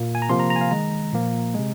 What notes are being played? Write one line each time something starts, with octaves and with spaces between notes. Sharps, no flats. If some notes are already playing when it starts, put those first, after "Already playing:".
Already playing: A#2 A#3
G#5
A#5
C3 F3 A#3 C6
A#5
A#5
G#5
F5
D#3 G#3 A#5
A#2 F3 A#3
C3 G#3